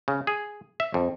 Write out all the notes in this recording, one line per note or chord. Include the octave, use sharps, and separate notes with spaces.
C#3
G#4
E5
F2